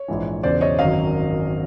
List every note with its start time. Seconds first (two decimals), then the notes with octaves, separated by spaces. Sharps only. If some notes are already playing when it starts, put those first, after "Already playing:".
Already playing: C#5
0.08 A#1 G#2 E3
0.43 E1 E2 C#3 C5 D5
0.61 C#5 D#5
0.79 G#1 F#2 D#3 F#3 D#5 F5